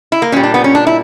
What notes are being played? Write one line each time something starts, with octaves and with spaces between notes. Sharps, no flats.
E4
A#3
A#2 G3 C#4
D4
B3
C#4
D4
E4